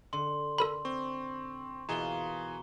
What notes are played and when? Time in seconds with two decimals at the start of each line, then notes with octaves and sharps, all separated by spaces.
0.13 D3 C6
0.58 A4 A#4 B5
0.85 C4 C#6
1.89 B2 E3 A#3 F4 G#4 A#5 G7